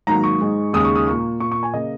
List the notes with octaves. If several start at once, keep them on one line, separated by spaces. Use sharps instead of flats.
G#2 D#3 F#3 A#3 A#5
C#6
G#2 G#3
D#2 C#3 G#3 D#6
C#6
D#6
A#2 A#3 C#6
A#2 A#3 C#6
C#6
G#5
C#3 A#3 D#5